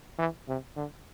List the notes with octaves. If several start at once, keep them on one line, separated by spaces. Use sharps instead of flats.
E3
C3
D3